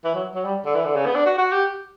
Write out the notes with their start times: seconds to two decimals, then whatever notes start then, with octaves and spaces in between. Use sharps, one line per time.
0.04 E3
0.14 F#3
0.35 F#3
0.45 G3
0.65 D3
0.74 E3
0.85 D3
0.95 C#3
1.06 B3
1.15 D4
1.26 F#4
1.38 F#4
1.52 G4